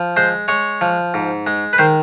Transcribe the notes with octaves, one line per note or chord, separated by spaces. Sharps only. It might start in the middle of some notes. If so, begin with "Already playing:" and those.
Already playing: F3
G#3 C5
G#3 C#5
F3
G#2
G#3
B4
D#3 C5